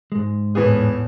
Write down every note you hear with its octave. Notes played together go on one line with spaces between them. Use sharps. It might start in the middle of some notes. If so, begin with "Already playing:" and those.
G#2 G#3
E2 A2 E3 B3 G#4